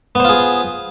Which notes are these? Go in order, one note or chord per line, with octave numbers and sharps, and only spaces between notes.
B3 F4 G#4 C5